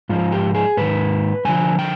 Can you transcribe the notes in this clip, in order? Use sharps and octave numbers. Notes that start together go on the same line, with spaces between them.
G#2 F3 F4
G4
G#4
G#2 D#3 B4
G2 D3 F3 G#5
G5